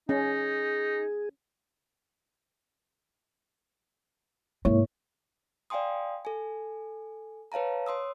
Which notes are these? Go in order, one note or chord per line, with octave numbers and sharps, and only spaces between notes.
C#4 D#4 G#4
G#2 C3 A#3 E4 C#5
D5 F5 G5 G#5 C6 D#6
A4 G#5
B4 C#5 F5 A5 A#5
C#5 C6 D#6 E6